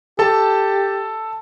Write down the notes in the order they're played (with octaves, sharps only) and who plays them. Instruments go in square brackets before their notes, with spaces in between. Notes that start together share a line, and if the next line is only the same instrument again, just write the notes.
[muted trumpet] G4 [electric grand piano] A4 A5